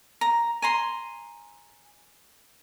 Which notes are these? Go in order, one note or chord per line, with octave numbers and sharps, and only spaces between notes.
A#5
G#5 A#5 C6